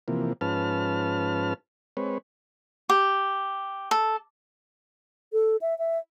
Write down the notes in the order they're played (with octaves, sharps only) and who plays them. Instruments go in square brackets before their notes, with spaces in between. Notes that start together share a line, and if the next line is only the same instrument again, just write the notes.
[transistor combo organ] C3 E3 F3 A#3
G#2 F3 C#4 B4 A5 F6
G#3 C4 B4 C#5
[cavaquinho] G4
A4
[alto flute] A4
E5
E5